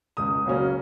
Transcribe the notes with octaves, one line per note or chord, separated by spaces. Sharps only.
C#2 D#6
C#3 F#3 A#3 C#4